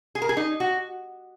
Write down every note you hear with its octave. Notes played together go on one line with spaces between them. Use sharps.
G#4
A#4
G#4
D#4
F#4